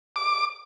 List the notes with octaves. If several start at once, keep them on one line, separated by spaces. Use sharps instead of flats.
D6